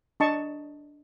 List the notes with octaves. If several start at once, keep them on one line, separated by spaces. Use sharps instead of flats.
D4 D#5 A5 C#6